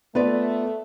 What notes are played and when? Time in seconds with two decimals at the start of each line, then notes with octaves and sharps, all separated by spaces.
0.15 A3 B3 F4 B4 D5